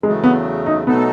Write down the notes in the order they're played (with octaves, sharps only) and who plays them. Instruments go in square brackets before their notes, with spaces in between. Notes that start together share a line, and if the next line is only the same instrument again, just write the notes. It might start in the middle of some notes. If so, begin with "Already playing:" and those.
[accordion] E2 C#3 F#3 A3 [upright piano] G#3
[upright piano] B3
D#4
[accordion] B2 F#3 A3 D#4 A4 [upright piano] B3